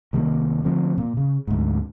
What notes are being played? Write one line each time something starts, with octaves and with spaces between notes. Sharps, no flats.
C2 D#3 G3 A#3
D3 F3 A3 C4
A#2
C#3
D2 G#2